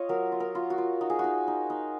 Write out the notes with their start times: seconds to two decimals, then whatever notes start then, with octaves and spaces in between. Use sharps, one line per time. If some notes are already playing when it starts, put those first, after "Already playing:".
Already playing: F4 C#5 D#5
0.09 F#3 A#4
0.32 F4
0.40 A#4
0.55 F4
0.70 F#4
0.78 F4
1.01 D#4 F#4
1.10 G#4
1.19 D#4 F#4
1.47 D#4
1.70 D#4